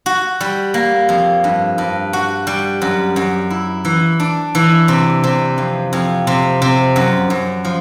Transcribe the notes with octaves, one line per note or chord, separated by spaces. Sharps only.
F#4
G3
A#3
F2
G2
G2
F#4
G3
F#2
F#2
E4
E3
D4
E3
C3
C3
F2
F2
C3
C3
F#2
F#2
F3